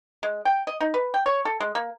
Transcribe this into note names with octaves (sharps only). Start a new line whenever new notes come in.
G#3
G5
D#5
D#4
B4
G5
C#5
A4
G#3
A#3